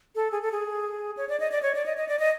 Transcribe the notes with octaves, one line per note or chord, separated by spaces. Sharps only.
A4
G#4
A4
G#4
C#5
D5
D#5
D5
C#5
D5
D#5
D#5
D5
D#5